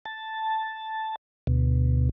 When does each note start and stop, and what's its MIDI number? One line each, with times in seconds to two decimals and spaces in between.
0.05 1.16 81
1.47 2.09 38
1.47 2.09 47